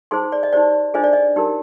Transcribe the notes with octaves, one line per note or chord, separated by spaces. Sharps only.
D#4 G#4 C5 C6
D5
D#5
D#4 G4 C5 D5
D4 F4 G#4 C5 D#5
D5
D#5
D#4 G4 A#4